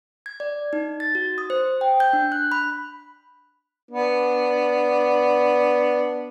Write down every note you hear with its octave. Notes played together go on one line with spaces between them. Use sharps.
G#6
D5
D#4
A6
F#4
D#6
C5
G5
G6
D4
F#6
B5
B3 D4